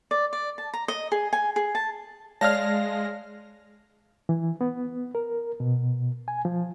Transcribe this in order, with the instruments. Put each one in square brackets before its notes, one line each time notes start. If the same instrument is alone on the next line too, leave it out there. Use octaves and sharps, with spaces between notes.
[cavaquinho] D5
D5
A5
A#5
D#5
G#4
G#5
G#4
A5
[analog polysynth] G#3 [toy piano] C#5 D5 [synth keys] F5 A#6 [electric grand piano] A5 F6
[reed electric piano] E3
B3
A#4
B2
G#5
F3